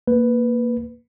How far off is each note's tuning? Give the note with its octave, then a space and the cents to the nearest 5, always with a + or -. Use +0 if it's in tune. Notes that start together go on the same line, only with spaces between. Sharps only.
A#3 +0 B4 +0